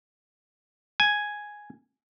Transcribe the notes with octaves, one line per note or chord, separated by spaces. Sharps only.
G#5